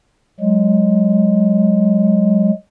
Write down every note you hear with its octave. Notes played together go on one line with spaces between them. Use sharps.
F#3 G#3